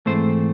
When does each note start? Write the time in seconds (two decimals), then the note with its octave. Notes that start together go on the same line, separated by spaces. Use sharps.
0.06 G#2 E3 A3 C4 C5